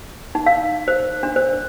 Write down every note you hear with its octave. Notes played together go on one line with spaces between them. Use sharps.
D#4
F5
C5
D4
C5